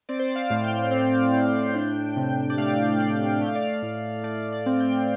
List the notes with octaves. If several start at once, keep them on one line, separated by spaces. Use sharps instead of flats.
C4 D5
C5
D5
F5
A2
G5
C4
A2
D4
C3
D5
A3 F5
A3 D5
A3 G5
F5
D5
F5
A2
A3 D5
D5
C4
G5